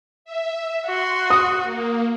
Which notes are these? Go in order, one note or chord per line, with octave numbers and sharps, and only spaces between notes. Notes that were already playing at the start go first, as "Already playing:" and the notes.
E5
F#4 C6
D#6
A#3